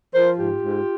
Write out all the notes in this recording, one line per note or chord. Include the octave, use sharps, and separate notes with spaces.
F3 A#4 C5
G#2 F4 G4
G#2